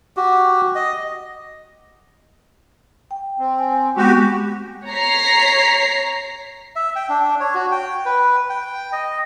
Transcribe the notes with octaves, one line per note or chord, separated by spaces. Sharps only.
F#4 G4
D#5
G5
C4
G#5
G#3 B3 F#4 G4
C#5 A#5 B6 C7
E5
G5
D4
C#5
F#4
G5
B4
G5
D#5